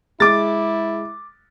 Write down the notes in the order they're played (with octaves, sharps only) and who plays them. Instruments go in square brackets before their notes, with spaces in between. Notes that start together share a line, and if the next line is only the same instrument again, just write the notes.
[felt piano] G#3 [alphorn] E4 [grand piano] D6 A6